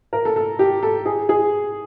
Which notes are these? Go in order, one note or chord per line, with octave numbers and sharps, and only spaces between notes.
A#4
A4
A4
G4
A4
G#4
G#4